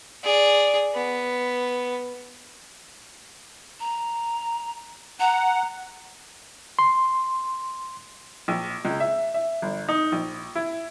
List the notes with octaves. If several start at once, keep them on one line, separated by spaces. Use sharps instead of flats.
G#4 D5
B3
A#5
F#5 A#5
C6
A#1
C#2
E5
E5
G1
D#4
A#1
E4